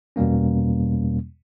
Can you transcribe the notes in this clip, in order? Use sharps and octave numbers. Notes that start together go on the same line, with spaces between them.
E2 B2 G3 A#3 C#4